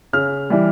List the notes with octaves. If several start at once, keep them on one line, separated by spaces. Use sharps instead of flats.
C#3 F6
E3 G3